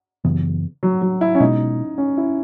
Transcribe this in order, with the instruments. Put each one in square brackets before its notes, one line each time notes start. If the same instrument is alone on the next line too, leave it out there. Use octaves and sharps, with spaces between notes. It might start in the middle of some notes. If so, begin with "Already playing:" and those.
[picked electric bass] F#2 C#3 E3 B3
[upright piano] F#3
F#3
E4
C#4
[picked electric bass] B2 G#3 B3 [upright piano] D#4
[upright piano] C#4
E4